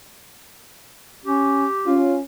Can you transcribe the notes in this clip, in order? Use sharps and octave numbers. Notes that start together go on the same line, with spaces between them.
C#4 G4
C#4 F4